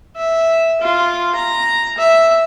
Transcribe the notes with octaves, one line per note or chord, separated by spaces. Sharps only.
E5
F4
A#5
E5